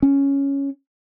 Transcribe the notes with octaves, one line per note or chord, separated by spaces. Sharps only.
C#4